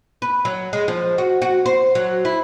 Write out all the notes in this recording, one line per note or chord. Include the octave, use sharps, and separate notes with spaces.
B4
F#3
G#3
F3
F#4
F#4
C5
F#3
E4